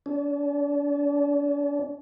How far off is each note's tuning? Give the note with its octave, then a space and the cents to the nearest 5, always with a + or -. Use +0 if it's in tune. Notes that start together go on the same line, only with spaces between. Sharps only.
D4 -40